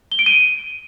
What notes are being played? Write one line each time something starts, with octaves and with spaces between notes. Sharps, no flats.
G7
D7
D#7